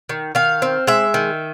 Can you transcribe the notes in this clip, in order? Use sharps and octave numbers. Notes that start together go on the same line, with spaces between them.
D#3
D#3 F5
C4
G#3 E5
D#3